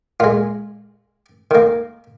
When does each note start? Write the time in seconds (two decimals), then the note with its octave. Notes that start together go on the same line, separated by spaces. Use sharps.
0.20 A#2 G#3 F4
1.51 D#3 A#3